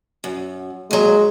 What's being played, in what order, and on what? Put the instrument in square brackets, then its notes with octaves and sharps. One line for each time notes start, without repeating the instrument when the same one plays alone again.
[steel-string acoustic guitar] F#2
[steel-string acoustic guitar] D#2 F#3 [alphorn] G#3